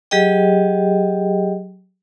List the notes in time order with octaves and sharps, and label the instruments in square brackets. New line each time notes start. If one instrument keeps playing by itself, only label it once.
[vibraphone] F#3 G4 G#4 D#5 G5